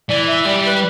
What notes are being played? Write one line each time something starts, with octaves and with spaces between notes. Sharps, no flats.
E3 D5
E5
G3 D5
B4